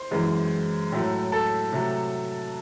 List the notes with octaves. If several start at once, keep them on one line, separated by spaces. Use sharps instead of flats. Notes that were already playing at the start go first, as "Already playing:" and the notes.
Already playing: C5
F#2 E3 G#3
A2 F#3 A3
A4
C3 F#3 A3